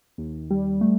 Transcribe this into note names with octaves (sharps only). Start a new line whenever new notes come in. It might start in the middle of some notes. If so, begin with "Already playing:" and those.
D#2
G3
A3